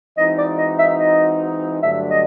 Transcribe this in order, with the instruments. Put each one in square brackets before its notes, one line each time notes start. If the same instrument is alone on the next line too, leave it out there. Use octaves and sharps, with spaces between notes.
[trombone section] E3 G#3 C4 D#4 F#4 [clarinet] D#5
[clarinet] D5
D#5
E5
D#5
[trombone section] G2 D3 F#3 A3 D4 [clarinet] E5
[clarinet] D#5